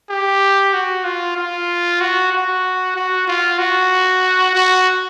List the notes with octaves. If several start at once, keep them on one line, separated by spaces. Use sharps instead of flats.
G4
F#4
F4
F4
F#4
F#4
F#4
F4
F#4
F#4